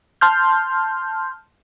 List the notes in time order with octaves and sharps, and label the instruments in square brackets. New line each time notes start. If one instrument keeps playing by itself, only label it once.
[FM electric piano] A5 C6 F6 G6